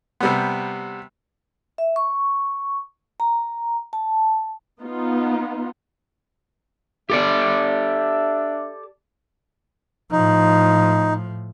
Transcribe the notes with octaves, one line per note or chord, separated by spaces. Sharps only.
C3 G3 B3
E5
C#6
A#5
A5
B3 D#4 F4
D4 G4 A4 D5 E5
A2 F3 D#4